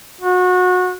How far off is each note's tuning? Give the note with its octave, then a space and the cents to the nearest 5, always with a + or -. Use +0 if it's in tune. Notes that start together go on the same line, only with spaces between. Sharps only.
F#4 -25